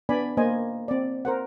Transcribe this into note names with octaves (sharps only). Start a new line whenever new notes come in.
B3 D4 D5 G#5 B5
A#3 C5 D#5 G#5
C4 D5
A#4 C5 F#5